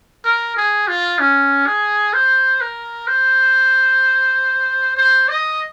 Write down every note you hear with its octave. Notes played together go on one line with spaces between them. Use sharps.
A#4
G#4
F4
C#4
G#4
C5
A#4
C5
C5
D#5